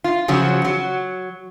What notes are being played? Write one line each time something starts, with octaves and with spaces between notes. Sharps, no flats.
F4
C#3 F3 F#3
F#3